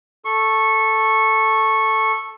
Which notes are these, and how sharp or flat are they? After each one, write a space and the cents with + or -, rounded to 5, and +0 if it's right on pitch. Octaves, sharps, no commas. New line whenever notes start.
A4 +0 C#6 -15